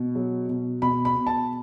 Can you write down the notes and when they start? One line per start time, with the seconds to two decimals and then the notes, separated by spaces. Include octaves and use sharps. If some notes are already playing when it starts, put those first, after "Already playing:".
Already playing: B2
0.15 F#3
0.49 B2
0.82 B2 B5
1.05 B5
1.16 B2
1.27 A5